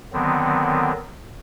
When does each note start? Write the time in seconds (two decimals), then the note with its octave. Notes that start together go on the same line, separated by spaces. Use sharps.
0.13 D3 D#3 F#3 B3 C4